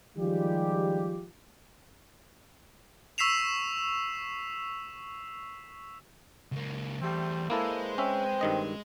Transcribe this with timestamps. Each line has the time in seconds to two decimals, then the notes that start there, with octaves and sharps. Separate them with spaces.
0.17 D#3 F3 G3 G#3 F4 G4
3.18 C#6 E6 B6 C7 E7 F7
6.52 C#2 A#3
7.02 E2 G3 A3 C4
7.50 G#3 A#3 E4 G#4 A4 B4 C5
7.98 C4 C#4 E5
8.41 G2 D#3 D#5